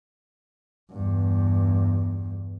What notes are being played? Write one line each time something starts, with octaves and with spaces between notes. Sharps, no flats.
E2 G2